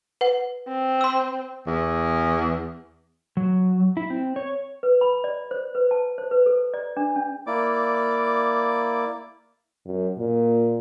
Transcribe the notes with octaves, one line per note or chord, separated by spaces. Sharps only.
B4 F#5
C4
C6 E6
E2
F#3
E4
C4
C#5
B4
B5
D5
C5
B4
A5
C5
B4
A4
D5
D4
C#4
A#3 E4 D5 D6
F#2
A#2